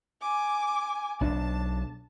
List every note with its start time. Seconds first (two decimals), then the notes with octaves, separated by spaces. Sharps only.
0.21 G#5 D6
1.21 B1 D4 A5